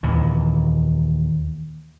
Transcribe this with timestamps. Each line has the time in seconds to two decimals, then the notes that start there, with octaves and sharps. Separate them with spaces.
0.03 D#2 A#2 E3